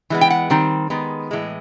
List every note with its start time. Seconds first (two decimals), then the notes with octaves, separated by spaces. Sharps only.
0.10 E3 G#3 B3
0.21 G5
0.30 F#5
0.50 D#3 G3 C4
0.90 D#3 G#3 B3
1.31 A2 E3 G#3